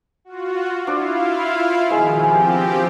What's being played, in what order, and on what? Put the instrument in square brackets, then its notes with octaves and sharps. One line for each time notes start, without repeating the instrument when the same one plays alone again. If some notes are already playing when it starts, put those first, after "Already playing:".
[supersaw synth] F4 F#4
[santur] D4 C5 D6 [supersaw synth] E4 F4 F5
[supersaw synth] B2 D#3 F3 [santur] G#3 E4 C5
[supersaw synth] F3 C4 G4 [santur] F5 G#5